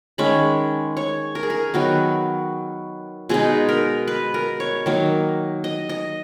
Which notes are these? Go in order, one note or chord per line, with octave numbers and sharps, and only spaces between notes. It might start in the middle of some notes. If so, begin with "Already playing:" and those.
D#3 G#3 C#4 B5
C#5
A#4
G#4
A#4
D#3 F#3 B3 F#4
B2 G#3 D#4 G#4
A#4
B4
A#4
C#5
D#3 F#3 A#3
D#5
D#5